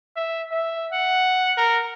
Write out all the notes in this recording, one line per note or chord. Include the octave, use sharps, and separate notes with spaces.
E5
E5
F#5
A#4